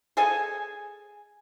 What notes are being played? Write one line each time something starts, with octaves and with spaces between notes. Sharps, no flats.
G#4 A4 G#5